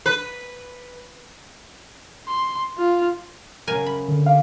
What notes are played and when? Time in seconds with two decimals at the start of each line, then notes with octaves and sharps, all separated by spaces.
0.06 B4
2.27 C6
2.78 F4
3.67 F#2 C#3 A#4 G#5
3.86 B5
4.09 D3
4.26 G4 F5